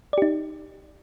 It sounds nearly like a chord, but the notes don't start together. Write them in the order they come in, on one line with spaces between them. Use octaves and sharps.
D5 G4 D#4